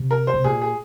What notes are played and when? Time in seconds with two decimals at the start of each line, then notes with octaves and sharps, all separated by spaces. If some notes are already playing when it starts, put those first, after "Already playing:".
Already playing: C3
0.11 A#4
0.27 C5
0.34 C3
0.44 A#2 G#4
0.62 G#4